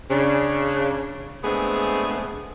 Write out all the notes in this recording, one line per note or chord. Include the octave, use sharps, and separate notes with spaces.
C#3 D4
G#3 A3 B3 C4 D4 G#4